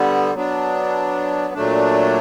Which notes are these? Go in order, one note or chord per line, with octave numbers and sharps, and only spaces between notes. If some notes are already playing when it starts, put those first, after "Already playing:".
Already playing: D3 G3 B3
F#3 B3 D4
A#2 F#3 A3 D4